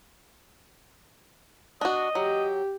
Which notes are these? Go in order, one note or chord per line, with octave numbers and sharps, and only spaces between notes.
D4 F#4 D#5
F#3 G4